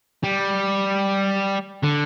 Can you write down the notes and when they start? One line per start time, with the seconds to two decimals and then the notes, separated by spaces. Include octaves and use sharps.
0.24 G3
1.83 D3